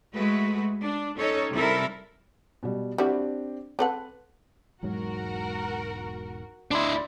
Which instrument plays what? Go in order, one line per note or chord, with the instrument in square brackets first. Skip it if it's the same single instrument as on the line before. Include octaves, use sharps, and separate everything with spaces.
[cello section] G#3 A3 F#4 B4
D4
C#4 D#4 A4 C#5
C3 G3 E4 A4 A#4
[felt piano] B2 G3
[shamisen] G3 E4 F#4 [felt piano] C4 D4 G4
[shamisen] C4 A4 F#5 [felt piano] B4
[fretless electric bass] E1 G#2 F#3 [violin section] F#4 A#4 F#5
[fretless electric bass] D2 [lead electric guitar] D4 E4 [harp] D5 B5 C6